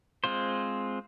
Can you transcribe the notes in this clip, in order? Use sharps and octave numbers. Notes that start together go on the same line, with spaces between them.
G#3 C4 F4 C5